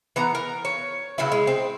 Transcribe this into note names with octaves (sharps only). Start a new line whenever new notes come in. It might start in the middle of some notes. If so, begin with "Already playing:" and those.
E3 B3 A#5
A#4
C#5
C#3 F#3 B3 E4
G#3
C4